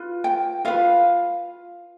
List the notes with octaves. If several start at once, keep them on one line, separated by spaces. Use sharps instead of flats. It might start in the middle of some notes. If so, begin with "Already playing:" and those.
Already playing: F4 B4
G5
F4 B4 F5